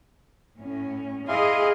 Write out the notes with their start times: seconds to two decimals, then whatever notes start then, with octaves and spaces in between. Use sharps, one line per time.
0.60 A2 C#4
1.28 E4 G#4 D#5 F5 C6